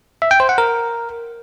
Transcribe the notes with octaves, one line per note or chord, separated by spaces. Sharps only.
E5
G5
C5
F#5
A#4